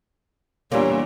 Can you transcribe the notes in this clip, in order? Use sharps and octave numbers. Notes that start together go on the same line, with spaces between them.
E2 A#2 G3 A#3 D4 C#5